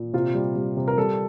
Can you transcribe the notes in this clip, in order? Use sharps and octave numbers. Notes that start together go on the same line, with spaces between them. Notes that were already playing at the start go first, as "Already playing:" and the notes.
Already playing: A#2
C3 F4
G3
G3
C3
A#4
G3 A4